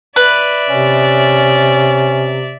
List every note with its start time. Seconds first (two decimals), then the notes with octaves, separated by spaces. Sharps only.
0.16 B4 D5 E5
0.69 C3 C#4